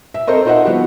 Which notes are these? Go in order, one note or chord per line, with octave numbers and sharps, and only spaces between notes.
E5
C4 A4 A#4 C5 D#5
D#4 F4 C5 D#5 E5 F#5
F3 B3 F#4 G4